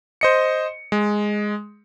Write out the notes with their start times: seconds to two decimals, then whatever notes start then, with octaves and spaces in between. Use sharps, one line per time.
0.21 C5 D#5 C#7
0.92 G#3